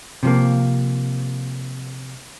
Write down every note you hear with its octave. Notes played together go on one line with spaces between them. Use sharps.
C3 F3 A#3